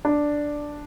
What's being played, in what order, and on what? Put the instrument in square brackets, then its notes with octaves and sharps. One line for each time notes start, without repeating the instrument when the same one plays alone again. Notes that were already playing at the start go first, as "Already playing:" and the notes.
[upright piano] D4